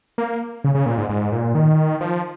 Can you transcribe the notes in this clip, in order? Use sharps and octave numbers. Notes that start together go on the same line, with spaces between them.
A#3
C#3
C#3
A#2
G#2
G#2
A#2
D#3
F3